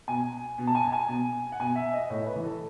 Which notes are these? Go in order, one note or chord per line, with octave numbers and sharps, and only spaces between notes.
B2 G#5
B2
A5
G#5
A5
G#5
B2
F#5
B2 G#5
E5
D#5
A2 C#5
B4
E3
A4